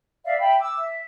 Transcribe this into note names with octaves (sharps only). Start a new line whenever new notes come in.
D5 E5 F5
E5 G5 B5
D6 E6
E5